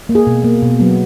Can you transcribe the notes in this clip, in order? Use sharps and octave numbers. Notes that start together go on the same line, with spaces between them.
A#3
G#4
B2
A#3
B2
F#3 B3